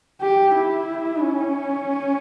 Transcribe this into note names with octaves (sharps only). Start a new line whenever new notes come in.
G4
E4
C#4